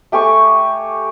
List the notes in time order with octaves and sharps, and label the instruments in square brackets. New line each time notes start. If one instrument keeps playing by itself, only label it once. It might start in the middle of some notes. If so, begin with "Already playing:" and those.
[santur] A3 G4 G#5 C#6